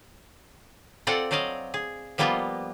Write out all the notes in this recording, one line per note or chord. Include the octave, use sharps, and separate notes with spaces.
C4 F4 A4 D5 F#5
F#3 C5 D5 D#5 F5
G#4
F3 G3 A#3 B3 F4 D#5